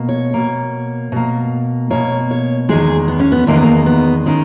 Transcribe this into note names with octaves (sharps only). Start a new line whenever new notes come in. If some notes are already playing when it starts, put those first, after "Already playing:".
Already playing: B2 A#3
C#5
B2 A#3
B2 A#3
B2 A#3 C#5
C#5
E2 D#3 G#3 G#4
B3
C#4
B3
E2 D#3 G#3 A#3
B3
A#3
B3
D#3 G#3 C#4